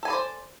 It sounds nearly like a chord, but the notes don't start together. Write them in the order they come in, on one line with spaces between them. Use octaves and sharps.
A4 G#5 B4 D5 C5